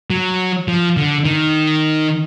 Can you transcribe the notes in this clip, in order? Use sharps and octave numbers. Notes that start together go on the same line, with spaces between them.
F#3
F3
D3
D#3